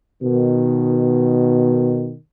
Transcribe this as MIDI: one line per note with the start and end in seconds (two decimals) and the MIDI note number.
0.23 2.15 47
0.23 2.15 51